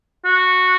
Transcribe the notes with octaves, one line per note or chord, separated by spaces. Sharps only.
F#4